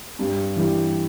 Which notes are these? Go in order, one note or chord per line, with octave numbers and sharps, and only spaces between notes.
G2
E3 G3